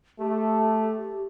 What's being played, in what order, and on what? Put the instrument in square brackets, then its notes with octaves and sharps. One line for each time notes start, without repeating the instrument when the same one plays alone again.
[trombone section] A3 [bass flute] G4